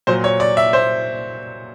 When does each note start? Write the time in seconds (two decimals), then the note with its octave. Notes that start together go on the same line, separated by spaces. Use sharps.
0.07 A#2 F#3 C5
0.24 C#5
0.40 D5
0.57 E5
0.73 C5